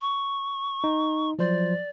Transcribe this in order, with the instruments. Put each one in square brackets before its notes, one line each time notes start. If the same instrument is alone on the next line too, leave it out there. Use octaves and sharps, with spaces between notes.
[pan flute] C#6
[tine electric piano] D#4
[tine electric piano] F3 F#3 C5 [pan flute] D5